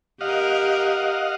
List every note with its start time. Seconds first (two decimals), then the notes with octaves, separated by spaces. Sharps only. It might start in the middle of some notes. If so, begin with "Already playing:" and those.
0.21 G4 A#4 D#5 F5 F#5